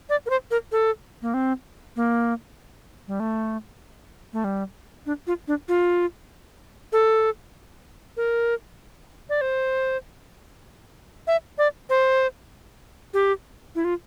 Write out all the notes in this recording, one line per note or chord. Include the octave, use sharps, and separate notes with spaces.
D5
A#4
C5
A#4
A4
A#3
C4
A#3
G3
A3
A3
G3
D4
F4
D4
F4
A4
A#4
D5
C5
E5
D5
C5
G4
E4
F4